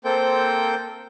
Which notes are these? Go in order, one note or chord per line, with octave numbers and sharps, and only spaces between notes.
A#3 C4 A4 C5 G5 G6